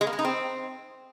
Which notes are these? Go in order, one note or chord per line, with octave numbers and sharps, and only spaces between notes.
G#3
A#3
G#3
D#4
C4